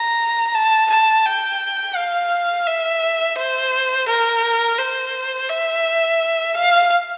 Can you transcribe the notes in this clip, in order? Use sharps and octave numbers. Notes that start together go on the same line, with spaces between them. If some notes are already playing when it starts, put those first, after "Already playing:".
Already playing: A#5
A5
A5
G5
F5
E5
C5
A#4
C5
E5
F5